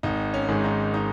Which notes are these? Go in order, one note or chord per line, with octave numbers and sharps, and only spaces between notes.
G#1 D#4
C#4
G#2 D#3 G#3
D#4
D#4